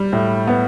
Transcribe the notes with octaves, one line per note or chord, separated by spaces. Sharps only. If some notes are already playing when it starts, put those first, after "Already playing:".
Already playing: G3
A2
B3